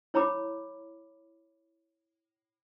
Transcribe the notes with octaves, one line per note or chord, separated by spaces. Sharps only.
E4 C#5 A#5 B5 D6